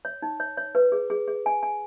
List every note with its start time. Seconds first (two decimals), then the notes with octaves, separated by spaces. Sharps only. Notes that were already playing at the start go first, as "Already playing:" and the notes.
0.05 C#5
0.22 D#4
0.40 C#5
0.57 C#5
0.75 B4
0.92 G#4
1.10 G#4
1.28 G#4
1.46 G#5
1.63 G#5